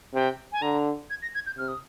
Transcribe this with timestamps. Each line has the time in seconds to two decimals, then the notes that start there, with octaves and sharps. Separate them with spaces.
0.14 C3 G5
0.52 G#5
0.62 D3 A#5
1.10 G#6
1.22 A#6
1.35 G#6
1.46 G6
1.58 C3 F6
1.68 D#6